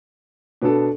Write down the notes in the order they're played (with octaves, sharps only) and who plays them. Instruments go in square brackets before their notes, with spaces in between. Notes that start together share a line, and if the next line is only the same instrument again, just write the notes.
[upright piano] B2 B3 D4 A4